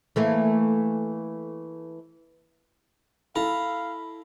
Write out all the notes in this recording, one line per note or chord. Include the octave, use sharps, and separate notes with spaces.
E3 A3 A#3
E4 A4 F5 A#5 B5